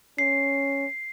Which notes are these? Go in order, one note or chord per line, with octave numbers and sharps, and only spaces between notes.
C#4 C7